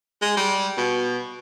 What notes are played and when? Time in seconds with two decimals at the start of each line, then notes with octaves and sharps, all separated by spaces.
0.22 G#3
0.37 G3
0.77 B2